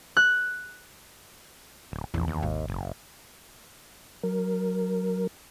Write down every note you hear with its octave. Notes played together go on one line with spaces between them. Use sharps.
F#6
D1
A#1 E2
D#2
G#1
F#1
F#3 A#4